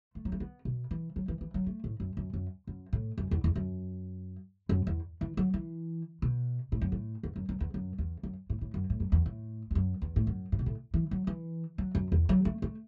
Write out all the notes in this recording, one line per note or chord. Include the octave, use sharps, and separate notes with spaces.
A3
F#3
A3
B3
B2
E3
F#3
E3
E3
F#3
A3
A2
F#2
F#2
F#2
F#2
A2
F#2
E2
E2
F#2
F#2
E2
E3
F#3
E3
B2
A2
F#2
A2
E2
F#2
F#2
E2
F#2
E2
F#2
A2
A2
F#2
A2
F#2
E2
A2
E2
F#2
E2
A2
F#2
A2
B2
A2
E3
F#3
E3
F#3
F#2
E2
F#3
A3
A3